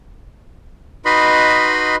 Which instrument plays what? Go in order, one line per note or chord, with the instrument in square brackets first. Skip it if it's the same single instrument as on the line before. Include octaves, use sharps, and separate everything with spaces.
[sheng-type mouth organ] D#4 F#4 B4 D#5 B5 C6